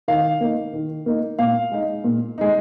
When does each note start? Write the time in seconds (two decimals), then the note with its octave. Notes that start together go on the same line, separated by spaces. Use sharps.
0.08 D#3 F5
0.41 A#3 D#4
0.73 D#3
1.06 A#3 D#4
1.39 A#2 F5
1.72 G#3 D#4
2.04 A#2
2.38 G#3 D#4